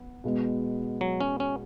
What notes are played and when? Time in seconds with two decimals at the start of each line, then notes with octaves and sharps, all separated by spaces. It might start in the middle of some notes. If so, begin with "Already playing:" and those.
Already playing: B3
0.24 B2 G#3 B3
1.01 F#3
1.21 C#4
1.40 C#4